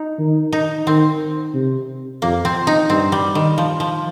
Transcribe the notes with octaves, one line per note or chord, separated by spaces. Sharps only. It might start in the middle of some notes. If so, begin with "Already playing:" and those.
Already playing: D#4
D#3
D#4
D#3 C4
C3
F2 A#3
C4
D#4
G2 C4
G3
D#3
F3
F3